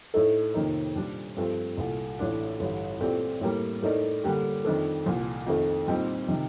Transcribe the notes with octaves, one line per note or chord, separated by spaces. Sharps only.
A2 A3 D#4 A4
F2 C3 D#3 A#3 D#4
A#2 G3 D4 F4
G2 F3 A3 C4 F4
C2 A#2 A3
A1 A2 A3 D4 F4
A1 G2 D3
A#2 A3 C4 G4 D5
A2 G3 A#3
A2 A3 D#4 A#4 D5
D3 G3 A#3 D4 G4
F2 D#3 A3 D4 A4
C2 A#2 F3
F2 D#3 A3
A#2 G3 C4 D#4 G4
C3 D#3